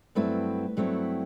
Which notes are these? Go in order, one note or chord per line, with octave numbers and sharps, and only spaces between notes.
G2 F#3 A3 C4 E4 B4
G2 F#3 A3 C4 E4